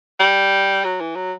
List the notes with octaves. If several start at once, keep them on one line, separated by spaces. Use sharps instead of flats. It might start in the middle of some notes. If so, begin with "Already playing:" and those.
G3
F#3
E3
F#3